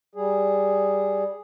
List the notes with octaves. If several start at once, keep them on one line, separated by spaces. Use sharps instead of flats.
G3 G#4